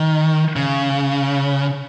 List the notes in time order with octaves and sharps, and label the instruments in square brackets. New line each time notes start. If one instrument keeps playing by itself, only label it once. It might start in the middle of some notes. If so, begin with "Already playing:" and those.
Already playing: [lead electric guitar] D#3
C#3